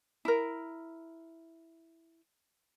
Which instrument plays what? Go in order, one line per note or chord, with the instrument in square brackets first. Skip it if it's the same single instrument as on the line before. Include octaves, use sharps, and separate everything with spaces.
[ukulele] E4 A#4